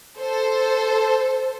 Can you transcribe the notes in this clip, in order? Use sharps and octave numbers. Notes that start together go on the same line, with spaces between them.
A4 C5